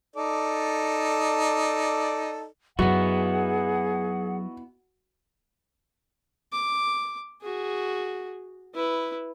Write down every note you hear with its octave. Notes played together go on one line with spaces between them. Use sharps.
D#4 A4 D5
F#2 F#3 B3 D#4 E4 F#4 G#4 F#5
D6
F#4 G#4
E4 B4